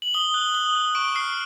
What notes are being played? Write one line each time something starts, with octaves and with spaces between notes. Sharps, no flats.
F#7
D#6 G7
F#6
D#6 G7
F#6
C#6 D7
F6 C7